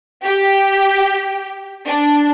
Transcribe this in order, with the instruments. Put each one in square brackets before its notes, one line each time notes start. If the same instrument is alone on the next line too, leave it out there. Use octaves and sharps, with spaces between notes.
[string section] G4
D4